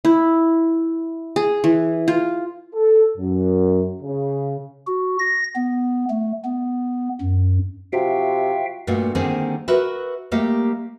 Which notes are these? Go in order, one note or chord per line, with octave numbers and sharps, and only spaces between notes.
E4
G#4
E3
F4
A4
F#2
C#3
F#4
A#6
B3
A3
B3
F#2
C3 F4 F#4 E5 F5 G5
G2 A#2 A3 A#3 F#4
D3 D#3 G3 A#3 C4 G#4
F#4 A#4 B4 E5
G3 A3 A#3 G4